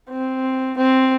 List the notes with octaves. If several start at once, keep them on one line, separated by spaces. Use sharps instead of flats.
C4
C4